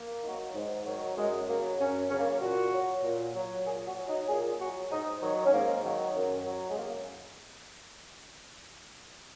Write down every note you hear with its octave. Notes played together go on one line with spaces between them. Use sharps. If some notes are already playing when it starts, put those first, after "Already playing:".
Already playing: A#3
D#3 F#3
G#2
D#3 F#3
F#2 G#3
C#3 F#3 A#3
F#2 C#4
C#3 F#3 C#4
A#3
C#4
A#2 F#4
F#3
A#2
F#3
A#2 G#4
F#4
F#3
D#4
A#2 G#4
F#3 F#4
G#2 D#4
D#3 F#3
C#4
G#2 A#3
D#3 F#3
F#2
F#3
G#3
F#2 A#3